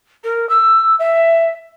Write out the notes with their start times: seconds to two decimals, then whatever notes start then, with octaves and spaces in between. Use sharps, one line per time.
0.23 A#4
0.49 E6
0.99 E5